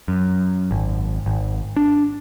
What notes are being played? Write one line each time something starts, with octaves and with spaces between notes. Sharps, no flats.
F#2
G#1
G#1
D4